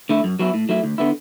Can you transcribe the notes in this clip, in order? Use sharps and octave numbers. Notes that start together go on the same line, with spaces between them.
D3 A3 E4
F#2
F#3 B3 E4
A2
F#3 A3 E4
D2
D3 B3 E4